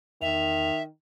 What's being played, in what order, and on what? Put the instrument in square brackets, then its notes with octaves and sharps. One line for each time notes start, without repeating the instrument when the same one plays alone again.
[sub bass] E2 [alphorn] D#3 [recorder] E5 [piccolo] F7